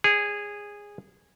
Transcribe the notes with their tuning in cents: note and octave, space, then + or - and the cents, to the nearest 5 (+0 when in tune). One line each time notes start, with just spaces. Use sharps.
G#4 -15 C#5 +20